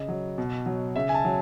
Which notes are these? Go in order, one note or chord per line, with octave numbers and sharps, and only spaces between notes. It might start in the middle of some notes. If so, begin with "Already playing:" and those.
Already playing: C#3 D#5
F#3
B2
F#3
C#3 E5
G#5
A5
F#3